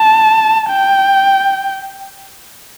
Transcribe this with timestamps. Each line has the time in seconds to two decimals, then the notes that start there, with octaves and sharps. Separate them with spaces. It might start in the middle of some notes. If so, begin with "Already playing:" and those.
Already playing: A5
0.70 G5